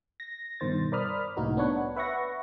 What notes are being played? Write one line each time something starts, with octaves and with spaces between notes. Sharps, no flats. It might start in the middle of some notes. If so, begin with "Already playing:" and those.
A#6
G2 B2 D#3 C5 A6
A#4 C5 D5 B5 D#6 F6
C2 A2 A#3 D#4 F#4 A#4
B3 D4 B4 C#5 F#5
B4 E5 F#5 C#6 A#6